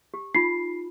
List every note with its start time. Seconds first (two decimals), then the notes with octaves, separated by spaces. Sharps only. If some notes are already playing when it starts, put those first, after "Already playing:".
0.14 G4
0.35 D#4 F4 B5 C7